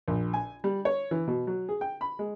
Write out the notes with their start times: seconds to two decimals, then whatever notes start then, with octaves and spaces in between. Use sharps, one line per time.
0.08 A#1
0.34 G#5
0.64 G3
0.85 C#5
1.11 E3
1.28 B2
1.47 F#3
1.69 G#4
1.81 G5
2.01 B5
2.19 G#3